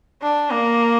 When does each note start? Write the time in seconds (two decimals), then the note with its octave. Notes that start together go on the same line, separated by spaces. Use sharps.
0.22 D4
0.51 A#3